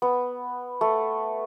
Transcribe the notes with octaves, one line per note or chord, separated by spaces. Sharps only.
B3
A3